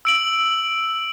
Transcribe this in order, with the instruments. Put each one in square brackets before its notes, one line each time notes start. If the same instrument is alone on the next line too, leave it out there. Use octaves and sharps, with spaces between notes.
[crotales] E6 D7 F#7